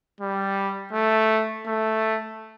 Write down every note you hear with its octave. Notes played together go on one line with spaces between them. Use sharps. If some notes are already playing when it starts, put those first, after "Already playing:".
G3
A3
A3